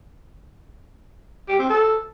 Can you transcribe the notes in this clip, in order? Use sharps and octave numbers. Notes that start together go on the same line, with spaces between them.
G4
C4
A4